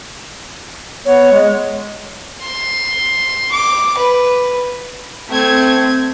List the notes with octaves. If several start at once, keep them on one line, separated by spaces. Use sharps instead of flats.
B3 C#5
G#3
C6
D6
B4
A3 C4 G#6